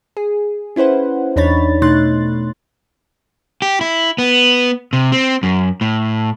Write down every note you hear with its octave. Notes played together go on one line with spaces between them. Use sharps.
G#4
C#4 E4 B4 C5 F#5
E2 D4 D#4 C#5 B5 A6
B2 A3 D#4 C6 F#6 A6
G4
E4
B3
C3
C4
F#2
A2